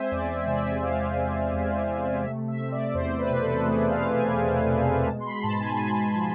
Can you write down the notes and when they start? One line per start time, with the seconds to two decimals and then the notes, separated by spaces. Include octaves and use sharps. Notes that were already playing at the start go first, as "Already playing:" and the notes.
Already playing: G#3 C4 C5 E5 G#5
0.11 E2 D5
0.35 E5
0.47 C3 D5
0.58 E5
0.82 G#3 F5
1.17 C4
1.53 E2
1.88 C3
2.24 A3 E5
2.48 E5
2.60 C4
2.72 D5
2.94 E2 C5
3.19 B4
3.30 B2
3.36 B4
3.42 A4
3.66 A3 G#4
3.90 F5
4.01 C4
4.13 G#5
4.36 E2
4.73 B2
5.07 G#3 A5
5.20 C6
5.26 B5
5.43 G#2 A5
5.60 G#5
5.78 G#2 G#5
6.14 F3